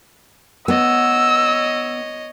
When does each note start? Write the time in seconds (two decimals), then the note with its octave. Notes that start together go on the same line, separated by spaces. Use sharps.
0.68 B3 C#5 D#5 E6